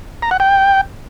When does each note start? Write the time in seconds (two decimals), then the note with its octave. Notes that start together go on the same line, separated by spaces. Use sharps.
0.22 A#5
0.31 F#5
0.40 G5